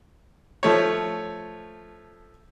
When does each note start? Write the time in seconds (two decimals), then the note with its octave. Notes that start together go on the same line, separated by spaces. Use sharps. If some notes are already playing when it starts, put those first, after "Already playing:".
0.63 F3 A3 C#5